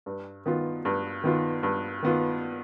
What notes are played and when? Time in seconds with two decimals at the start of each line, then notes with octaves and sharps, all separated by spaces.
0.06 G2
0.46 D#3 B3 F4
0.85 G2
1.23 D#3 B3 F4
1.63 G2
2.03 D#3 B3 F4